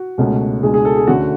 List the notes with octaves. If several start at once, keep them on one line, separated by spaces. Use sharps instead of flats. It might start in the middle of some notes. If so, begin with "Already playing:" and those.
Already playing: F#4
C#2 B2 A3 C#4
C#2 B2 G#3 D4 G#4
G#4
A4
G#4
D2 D3 A3 C#4 F#4